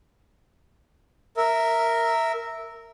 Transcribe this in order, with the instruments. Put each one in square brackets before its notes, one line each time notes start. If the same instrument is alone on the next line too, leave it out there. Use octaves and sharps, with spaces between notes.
[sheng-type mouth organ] A#4 E5